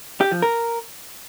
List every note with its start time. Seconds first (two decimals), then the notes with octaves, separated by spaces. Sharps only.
0.21 G4
0.32 F3
0.42 A#4